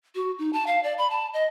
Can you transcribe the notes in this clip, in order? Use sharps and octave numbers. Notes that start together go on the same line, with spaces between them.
F#4
D#4
A5
F5
D5
B5
A5
D#5